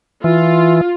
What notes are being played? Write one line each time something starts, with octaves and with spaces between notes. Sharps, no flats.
E3 F4